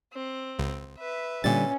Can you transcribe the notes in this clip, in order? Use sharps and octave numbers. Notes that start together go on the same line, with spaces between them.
C4
C#2
B4 E5
A#2 D3 G3 C#4 A6